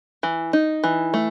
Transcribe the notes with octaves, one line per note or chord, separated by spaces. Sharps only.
E3
D#4
E3
A3